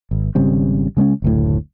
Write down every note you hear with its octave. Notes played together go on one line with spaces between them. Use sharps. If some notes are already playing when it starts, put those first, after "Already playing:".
G#1
G#1 C#3 G3 C4
C#3 G#3 A3 C#4
F#1 D2 A2